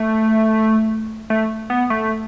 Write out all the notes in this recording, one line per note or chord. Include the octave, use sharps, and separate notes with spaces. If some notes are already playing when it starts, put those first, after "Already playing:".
Already playing: A3
A3
B3
A3